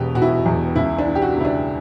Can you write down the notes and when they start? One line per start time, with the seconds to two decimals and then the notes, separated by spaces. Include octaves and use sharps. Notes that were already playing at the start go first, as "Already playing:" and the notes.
Already playing: E1 B2 G4
0.15 B2 F#4
0.22 E4
0.29 F#4
0.46 E2
0.76 C#2 E4
0.99 D4
1.07 E3
1.15 G4
1.22 F#4
1.37 C#3 E4
1.45 D4